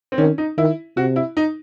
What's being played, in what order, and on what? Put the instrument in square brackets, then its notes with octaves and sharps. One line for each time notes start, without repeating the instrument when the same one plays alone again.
[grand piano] C4
[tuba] D#3 [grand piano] C#4
[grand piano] D#4
[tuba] D#3 [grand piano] E4
[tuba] C3 [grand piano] F#4
[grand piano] E4
D#4